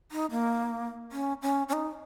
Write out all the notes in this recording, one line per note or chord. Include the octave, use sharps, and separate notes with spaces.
D#4
A#3
C#4
C#4
C#4
D#4